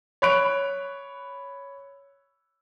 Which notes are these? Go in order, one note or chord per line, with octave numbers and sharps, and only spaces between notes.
C#5 B5 F#6 D7 F7